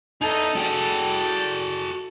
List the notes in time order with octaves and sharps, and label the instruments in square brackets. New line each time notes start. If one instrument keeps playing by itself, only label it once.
[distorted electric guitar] E2 [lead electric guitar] D#4 [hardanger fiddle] A4
[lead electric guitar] F#4 G#4 [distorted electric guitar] D5 G5